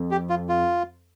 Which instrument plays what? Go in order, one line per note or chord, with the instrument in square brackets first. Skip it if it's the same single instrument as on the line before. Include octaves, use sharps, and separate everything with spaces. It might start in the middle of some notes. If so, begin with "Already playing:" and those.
Already playing: [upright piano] F2
[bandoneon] G4
F4
F4